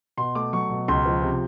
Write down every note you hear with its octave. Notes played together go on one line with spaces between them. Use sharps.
B2 C6
A3 D6
F#3 C#6
B2
C#2 C6
F3
C3